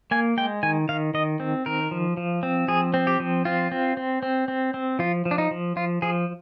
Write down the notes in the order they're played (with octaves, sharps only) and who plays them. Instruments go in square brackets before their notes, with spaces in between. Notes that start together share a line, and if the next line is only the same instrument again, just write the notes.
[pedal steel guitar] A#3 G#5
G#3 G5
D#3 G#5
D#3 F5
D#3 D#5
C4
D#3 A#4
F3
F3
C4
F3 G#4
C4
G4
F3
C4 F4
C4
C4
C4
C4
C4
F3 F4
F3
D4
D#4
F3
F3 F4
F3 G#4